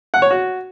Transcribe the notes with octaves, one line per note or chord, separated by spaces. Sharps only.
F#5
C#5
F#4